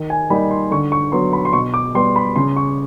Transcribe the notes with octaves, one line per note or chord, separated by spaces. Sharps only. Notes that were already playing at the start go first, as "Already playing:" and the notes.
Already playing: D#3
G#5
G3 A#3 D#4 B5
C6
D3 C#6
C#6
F#3 B3 C6
B5
C6
B2 C#6
D6
G3 B3 C6
B5
C#3 C6
C#6